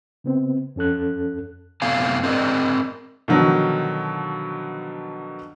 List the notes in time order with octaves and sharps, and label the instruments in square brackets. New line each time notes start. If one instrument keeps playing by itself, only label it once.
[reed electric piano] C#3 B3 C4
F2 C#4 A4 F#6
[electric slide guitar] F#2 C3 A3 B3 F5 G#5
C4 G#4 A#4 D5 D#5
[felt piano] B2 D3 D#3 F3 F#3